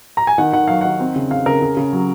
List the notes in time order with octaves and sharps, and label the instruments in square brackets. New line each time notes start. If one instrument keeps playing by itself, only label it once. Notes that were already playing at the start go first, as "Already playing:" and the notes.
[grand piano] A#5
G#5
D#3 F#5
D#3 F#5
F#3 F5
D#3 F#5
C4
C#3
C#3 F5
C#3 A#4
C#3
C#3
F#3